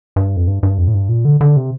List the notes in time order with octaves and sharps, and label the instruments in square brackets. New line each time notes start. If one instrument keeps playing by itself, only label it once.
[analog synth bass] G2
F2
G2
G2
F2
A2
G2
A#2
D3
D3
C3